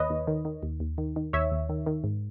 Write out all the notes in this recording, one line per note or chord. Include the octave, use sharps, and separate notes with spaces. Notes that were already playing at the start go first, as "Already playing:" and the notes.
Already playing: D#2 B4 C#5 D#5
D#2
D#3
D#3
D#2
D#2
D#3
D#3
D#2 C#5 E5
D#2
D#3
D#3
G#2